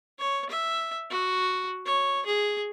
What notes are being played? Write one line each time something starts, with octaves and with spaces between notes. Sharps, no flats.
C#5
E5
F#4
C#5
G#4